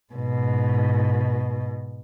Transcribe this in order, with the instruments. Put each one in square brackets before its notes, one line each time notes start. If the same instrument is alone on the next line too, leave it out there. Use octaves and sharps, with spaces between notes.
[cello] G#2 B2